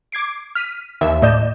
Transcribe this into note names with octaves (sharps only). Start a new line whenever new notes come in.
D6 G#6 C7 D7
F6 B6 D#7
D#2 E5
A2 D5 D#5 G6 E7